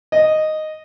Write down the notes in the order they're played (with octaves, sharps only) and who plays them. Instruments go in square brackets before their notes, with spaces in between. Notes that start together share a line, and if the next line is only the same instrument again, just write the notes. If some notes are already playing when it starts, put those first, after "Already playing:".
[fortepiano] D#5